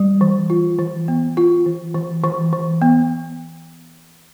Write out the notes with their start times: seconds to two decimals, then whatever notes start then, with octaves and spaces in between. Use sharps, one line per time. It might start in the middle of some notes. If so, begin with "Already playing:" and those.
Already playing: G3
0.21 E3
0.50 F4
0.79 E3
1.08 B3
1.37 F4
1.66 E3
1.95 E3
2.24 E3
2.53 E3
2.82 B3